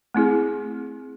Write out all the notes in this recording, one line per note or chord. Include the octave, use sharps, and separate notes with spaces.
A3 C4 E4 G#4